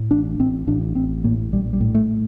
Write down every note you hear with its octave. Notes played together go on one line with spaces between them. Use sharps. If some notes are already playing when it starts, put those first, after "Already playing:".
Already playing: A2
A1 D4
A1 C4
A1 D4
A1 C4
A2 A#3
A#1 G3
G3
A2
A3